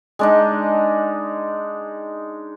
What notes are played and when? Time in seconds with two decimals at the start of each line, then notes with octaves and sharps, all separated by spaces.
0.19 G#3 D4 D#4